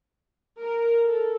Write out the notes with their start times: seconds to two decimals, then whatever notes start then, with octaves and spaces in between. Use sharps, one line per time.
0.58 A#4
1.05 A4